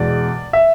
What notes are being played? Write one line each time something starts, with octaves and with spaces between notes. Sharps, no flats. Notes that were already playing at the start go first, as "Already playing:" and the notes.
Already playing: E2 B2 G#3 D5
E5